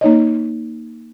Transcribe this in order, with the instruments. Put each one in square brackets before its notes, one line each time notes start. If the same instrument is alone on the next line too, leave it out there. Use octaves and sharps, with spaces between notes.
[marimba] A#3 D#4 C#5 D#5